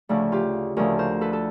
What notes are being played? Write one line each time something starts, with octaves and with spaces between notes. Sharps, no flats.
D2 C#3 F3 A3 D4
F4 G4
D2 C#3 F3 A3 D4 G#4 A#4
A#4 C5
A4 B4
A4